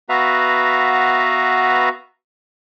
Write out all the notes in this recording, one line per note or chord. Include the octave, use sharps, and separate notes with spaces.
B3 F#4 B4 E5 F5 A#5